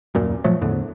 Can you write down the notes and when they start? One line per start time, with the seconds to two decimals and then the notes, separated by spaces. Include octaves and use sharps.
0.15 D#1 F#2 A#2
0.44 A#2 F3 F#3 A3
0.61 E2 A2 D3